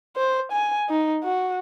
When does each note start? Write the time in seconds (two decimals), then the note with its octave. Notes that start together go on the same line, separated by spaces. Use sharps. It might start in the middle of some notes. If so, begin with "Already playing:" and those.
0.17 C5
0.52 G#5
0.89 D#4
1.24 F#4